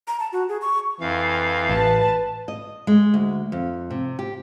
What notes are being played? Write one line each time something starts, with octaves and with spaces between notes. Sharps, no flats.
A#5
A5
F#4
G#4
C#6
F2 E3 F5
A1 B4 A5
D#5
G#3
D2
F2
C3
G4